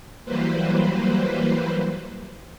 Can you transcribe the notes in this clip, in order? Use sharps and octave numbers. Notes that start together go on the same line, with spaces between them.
E3 F#3 G3 A#3 B4 C5